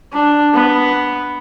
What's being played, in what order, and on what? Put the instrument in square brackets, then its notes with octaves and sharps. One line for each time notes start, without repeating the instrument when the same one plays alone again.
[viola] D4
B3